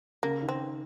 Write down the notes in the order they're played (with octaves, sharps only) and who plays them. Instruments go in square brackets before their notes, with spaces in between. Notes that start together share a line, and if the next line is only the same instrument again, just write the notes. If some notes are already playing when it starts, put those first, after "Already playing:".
[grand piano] C#3 [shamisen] A#3
[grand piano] D#3
[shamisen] C4